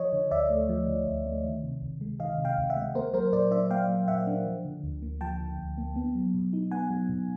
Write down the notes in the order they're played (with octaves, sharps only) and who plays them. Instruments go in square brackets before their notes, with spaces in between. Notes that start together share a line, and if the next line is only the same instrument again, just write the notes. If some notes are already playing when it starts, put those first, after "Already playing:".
Already playing: [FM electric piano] F3 C#5 D#5
D3
D2 D5 E5
A3
F3
D3
D2
A3
D#3
C3
C#2
G#3
D#3 D#5 F5
C3
F5 G5
C#2
E5 F#5
G#3
A#3 A#4 C5
F#3 A#4 C5
A#2 C5 D5
D4 D5 E5
A#3 F5 G5
F#3
A#2 E5 F#5
D4
F3
D3
D2
A#3
F3 G5 A5
D3
D2
A#3
B3
F#3
B2
D#4
B3 F#5 G#5
F#3
B2